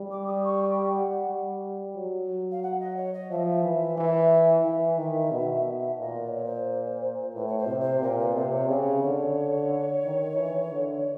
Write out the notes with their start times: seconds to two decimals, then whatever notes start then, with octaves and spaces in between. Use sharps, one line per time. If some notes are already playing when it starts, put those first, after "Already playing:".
Already playing: G3
0.11 D6
0.26 D#6
0.44 C#6
0.61 G5
0.95 F#5
1.28 G3
1.96 F#3
2.51 F5
2.63 F#5
2.80 D#5
2.96 C#5
3.13 D#5
3.30 F3 E5
3.64 E3
3.98 E3
4.64 E3 E5 F5
4.98 D#3
5.32 B2
6.00 A#2 D#5
6.23 D5
6.27 C#5
6.45 C5
7.35 A2 B4
7.47 C#5
7.58 C5
7.68 C3
7.80 C5
8.02 A#2 A#4
8.19 B4
8.35 C3 C5
8.52 C#5
8.69 C#3 D5
8.73 C#5
9.04 D3
10.05 D#3
10.37 E3
10.72 D3